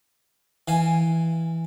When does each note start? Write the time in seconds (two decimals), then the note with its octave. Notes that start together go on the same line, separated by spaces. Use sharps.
0.68 E3 F5 G#5